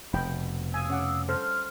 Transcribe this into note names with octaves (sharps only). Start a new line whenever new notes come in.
F1 B2 G5 B5
F5 G#5 D#6 E6
C#4 F#5 D6
G3 A4 C5 C6 F6